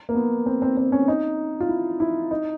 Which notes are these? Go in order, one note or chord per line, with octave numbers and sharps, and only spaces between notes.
A#3
B3
C4
C4
C4
C#4
D#4
F4
E4
E4
D#4